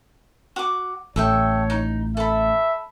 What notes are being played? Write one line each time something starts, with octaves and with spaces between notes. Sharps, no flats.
F#4 D6
A1 A4 C#5 E5 G5
D#4
A4 E5 B5